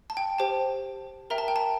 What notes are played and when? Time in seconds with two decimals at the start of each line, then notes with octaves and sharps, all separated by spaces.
0.10 A5
0.17 G5
0.38 G4 C5 G5 A5
1.30 A#4 E5 G5 A#5
1.38 A5
1.48 G5
1.56 A5